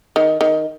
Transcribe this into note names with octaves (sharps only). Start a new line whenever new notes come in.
D#3
D#3